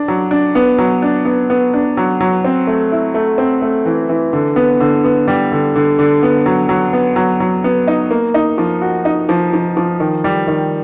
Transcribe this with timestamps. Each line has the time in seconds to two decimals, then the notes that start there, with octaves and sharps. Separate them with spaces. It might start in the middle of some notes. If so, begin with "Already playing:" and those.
Already playing: D4
0.08 F#3
0.31 D4
0.55 B3
0.78 F#3
1.02 D4
1.25 B3
1.50 B3
1.74 D4
1.97 F#3
2.21 F#3
2.45 C4
2.67 A3
2.92 E4
3.14 A3
3.38 C4
3.62 A3
3.86 E3
4.09 E3
4.33 D3
4.56 B3
4.80 D3
5.04 B3
5.28 G3
5.52 D3
5.75 D3
5.99 D3
6.23 B3
6.46 F#3
6.69 F#3
6.93 B3
7.16 F#3
7.40 F#3
7.64 B3
7.88 D#4
8.11 A#3
8.34 D#4
8.58 F3
8.82 F#4
9.05 D#4
9.29 F3
9.53 F3
9.77 F3
10.00 D#3
10.24 G3
10.48 D#3